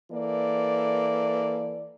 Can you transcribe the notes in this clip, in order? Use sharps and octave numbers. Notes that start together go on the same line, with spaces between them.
E3 A#3 A4 D5